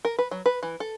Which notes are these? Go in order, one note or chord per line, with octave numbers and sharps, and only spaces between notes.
A#4
B4
F#3
B4
E3
A4